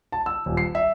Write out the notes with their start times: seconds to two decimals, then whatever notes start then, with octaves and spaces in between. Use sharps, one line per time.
0.12 A5
0.26 E6
0.46 D#1
0.57 C7
0.75 E5